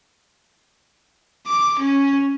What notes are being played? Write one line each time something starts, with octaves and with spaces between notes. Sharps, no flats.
D6
C#4